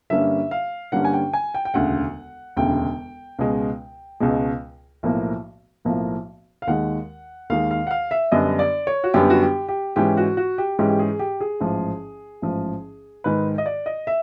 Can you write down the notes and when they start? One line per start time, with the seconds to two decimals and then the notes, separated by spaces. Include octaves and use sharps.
0.10 G2 D3 G3 A#3 C#4 E5
0.51 F5
0.92 G2 D3 G3 A#3 C#4 F#5
1.05 G#5
1.13 G5
1.33 G#5
1.54 G5
1.65 G5
1.74 E1 D2 C#3 F#5
2.57 E1 D2 C#3 G5
3.39 C#2 B2 G#3
4.20 C#2 B2 G#3
5.03 B1 A2 F3 A#3
5.85 B1 A2 F3 A#3
6.62 F5
6.67 D#2 D#3 G#3 F#5
7.50 D#2 D#3 G#3 F5
7.71 F5
7.87 F#5
7.91 F5
8.11 E5
8.32 F#2 D3 G3 B3 D4 D#5
8.59 D5
8.87 C#5
9.04 F#4
9.14 F#2 D3 G3 B3 D4 G4
9.30 F#4
9.42 G4
9.68 G4
9.96 G#2 E3 G#3 C#4 G4
10.17 F#4
10.37 F#4
10.58 G4
10.79 G#2 E3 G#3 C#4 G4
10.89 G4
10.99 G#4
11.19 G4
11.41 G#4
11.60 A1 G#2 F3
12.42 A1 G#2 F3
13.24 G#2 D#3 G#3 B4
13.58 D#5
13.66 D5
13.86 D#5
14.07 E5